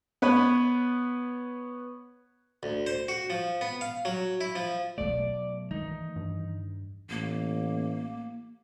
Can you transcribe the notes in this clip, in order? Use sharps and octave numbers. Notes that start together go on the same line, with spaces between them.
B3 B4 C#5
D2
C5
F#4
F3
B3
F5
F#3
E4
F3
B2 F#3 A3 D5
D#3 E3 D#4
G2
A1 A#3